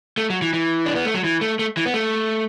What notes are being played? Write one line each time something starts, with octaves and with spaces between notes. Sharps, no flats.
A3
F#3
E3
E3
D4
B3
A3
F#3
E3
A3
A3
E3
B3
A3